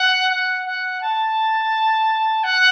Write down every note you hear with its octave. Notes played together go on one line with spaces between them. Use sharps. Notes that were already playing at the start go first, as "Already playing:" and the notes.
Already playing: F#5
F#5
F#5
A5
F#5